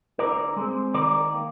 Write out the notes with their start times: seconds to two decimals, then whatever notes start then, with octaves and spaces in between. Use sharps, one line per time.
0.18 D3 A#4 D5
0.57 G#3 C4
0.94 D#3 A#4 D5
1.33 A#3